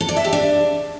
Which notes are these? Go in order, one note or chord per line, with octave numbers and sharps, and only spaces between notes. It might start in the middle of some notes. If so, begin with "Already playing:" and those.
A4
D5
E5
G4
D4